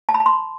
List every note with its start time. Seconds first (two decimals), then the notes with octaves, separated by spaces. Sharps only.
0.09 A5
0.14 B5
0.20 A5
0.26 C6